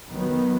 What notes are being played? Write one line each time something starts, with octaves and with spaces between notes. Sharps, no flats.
D#3 F#3 B3